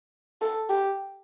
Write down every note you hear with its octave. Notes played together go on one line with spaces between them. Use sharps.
A4
G4